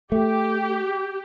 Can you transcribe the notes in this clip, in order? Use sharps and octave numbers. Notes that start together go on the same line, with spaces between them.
A3 G4